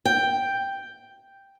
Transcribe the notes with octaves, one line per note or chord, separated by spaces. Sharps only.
G5